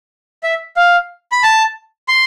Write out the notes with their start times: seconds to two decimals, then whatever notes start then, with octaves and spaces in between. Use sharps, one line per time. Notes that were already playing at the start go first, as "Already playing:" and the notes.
0.43 E5
0.76 F5
1.32 B5
1.43 A5
2.08 C6